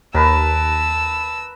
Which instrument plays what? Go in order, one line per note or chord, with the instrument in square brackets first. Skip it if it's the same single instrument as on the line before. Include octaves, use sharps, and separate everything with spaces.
[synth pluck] D#2 [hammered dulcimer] A#4 B4 [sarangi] A5 [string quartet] E6